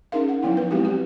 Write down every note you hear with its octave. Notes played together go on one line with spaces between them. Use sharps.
C#4 D#4 G#4 A#4 E5 F5
F#5
F3 F#3 B3 D#4 E4
B4
F#3 G#3 C4 E4 F#4 G4
G4